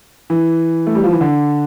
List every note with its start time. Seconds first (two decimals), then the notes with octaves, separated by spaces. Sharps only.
0.30 E3
0.87 A3
0.95 G3
1.04 F3
1.12 E3
1.21 D3